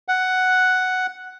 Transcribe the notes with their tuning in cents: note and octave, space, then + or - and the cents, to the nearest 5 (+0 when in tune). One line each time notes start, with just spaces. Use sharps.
F#5 +5